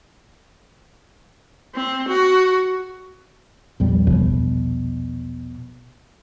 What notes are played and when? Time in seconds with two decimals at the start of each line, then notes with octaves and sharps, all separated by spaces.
1.75 C4
2.08 F#4
3.80 A#1 E2 G3
4.07 B2